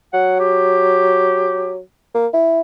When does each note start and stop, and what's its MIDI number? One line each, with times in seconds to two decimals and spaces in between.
0.14 1.79 54
0.14 0.35 78
0.40 1.74 67
2.14 2.27 58
2.34 2.61 64